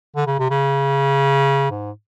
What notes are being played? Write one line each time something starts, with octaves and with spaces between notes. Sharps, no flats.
D3
C#3
C3
C#3
G#2